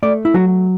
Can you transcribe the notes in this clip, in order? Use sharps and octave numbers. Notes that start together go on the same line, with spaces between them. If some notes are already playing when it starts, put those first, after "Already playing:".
A3 D5
E4
F#3 F#4